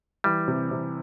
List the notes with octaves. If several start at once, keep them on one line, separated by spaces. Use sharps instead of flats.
E3 G3
C3
C3